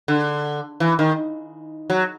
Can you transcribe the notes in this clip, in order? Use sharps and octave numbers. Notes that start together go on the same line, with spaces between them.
D3
E3
D#3
F#3